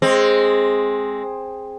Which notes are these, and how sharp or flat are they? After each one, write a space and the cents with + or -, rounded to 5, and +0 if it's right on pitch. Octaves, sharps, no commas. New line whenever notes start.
G#3 +0 C4 +10